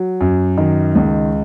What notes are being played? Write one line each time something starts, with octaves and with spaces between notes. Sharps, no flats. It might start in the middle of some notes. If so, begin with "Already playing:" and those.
Already playing: F#3
F#2
D#3
C#2